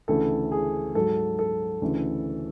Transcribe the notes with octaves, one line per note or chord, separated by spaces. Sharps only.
D2 C#3 E3 A4
G#4
G#2 F#3 A4
A4
D2 C#3 E3